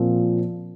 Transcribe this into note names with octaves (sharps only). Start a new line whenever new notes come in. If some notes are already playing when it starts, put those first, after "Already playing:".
Already playing: A#2 F3 C4